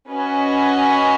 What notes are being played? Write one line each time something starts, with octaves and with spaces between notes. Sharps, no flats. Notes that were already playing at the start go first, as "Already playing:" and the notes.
C#4 F#4 B4 D#5 G#5